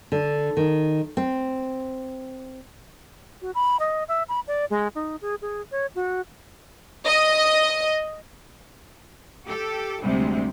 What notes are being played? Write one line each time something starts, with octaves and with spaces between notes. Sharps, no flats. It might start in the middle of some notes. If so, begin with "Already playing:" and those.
D3
D#3
C4
F#4
B5
D#5
E5
B5
D5
G#3
D#4
G#4
G#4
C#5
F#4
D#5
G4 A4
D2 C3 G3 G#3